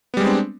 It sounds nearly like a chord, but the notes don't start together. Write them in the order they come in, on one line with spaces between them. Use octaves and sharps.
B3 G3 G#3 C4 D4